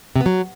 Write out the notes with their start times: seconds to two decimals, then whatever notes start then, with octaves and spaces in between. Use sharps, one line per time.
0.16 C3
0.21 B3
0.26 F#3